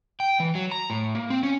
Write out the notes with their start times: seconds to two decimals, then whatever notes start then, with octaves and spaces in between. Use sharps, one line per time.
0.20 G5
0.40 E3
0.55 F#3
0.72 A#5
0.90 A2
1.15 A#3
1.30 C4
1.43 C#4